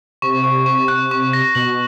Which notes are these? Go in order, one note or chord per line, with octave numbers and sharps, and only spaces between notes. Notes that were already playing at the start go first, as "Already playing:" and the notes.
C3 C#6
C#6
C#6
F#6
C#6
A#6
B2 F#7